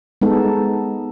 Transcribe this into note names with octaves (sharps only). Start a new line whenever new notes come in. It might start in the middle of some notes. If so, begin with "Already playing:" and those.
G#3 B3 D#4 A4